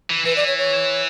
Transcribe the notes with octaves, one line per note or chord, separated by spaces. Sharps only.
E3
E3 B4
D5
C#5
C#5